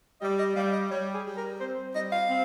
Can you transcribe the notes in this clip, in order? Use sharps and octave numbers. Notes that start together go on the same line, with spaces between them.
G3 D#5
D#5
G3 F5
D#5
G3 C#5
G#4
G3
A#4
C4 C5
G3 D#5
F5
C4